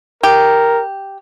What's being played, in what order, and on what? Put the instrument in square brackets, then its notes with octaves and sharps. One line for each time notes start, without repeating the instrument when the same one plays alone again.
[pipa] G4 [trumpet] A#4